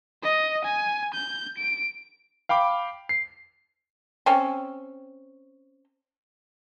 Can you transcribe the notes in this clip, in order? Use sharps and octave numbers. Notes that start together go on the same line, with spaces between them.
D#5
G#5
G6
D7
F5 G5 B5 D6
C7
C4 C#4